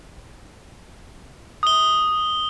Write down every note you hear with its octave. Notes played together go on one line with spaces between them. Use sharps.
D#6 G7